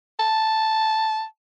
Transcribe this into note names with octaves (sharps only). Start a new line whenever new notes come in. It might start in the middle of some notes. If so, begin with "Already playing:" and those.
A5